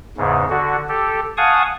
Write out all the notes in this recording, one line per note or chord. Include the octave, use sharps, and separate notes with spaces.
E2 G#2 C#3
D3 F#4
G4 A4
F5 F#5 G#5 A5 C#6 D#6